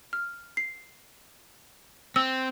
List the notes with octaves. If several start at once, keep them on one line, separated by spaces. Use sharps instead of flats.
F6
C7
C4 E6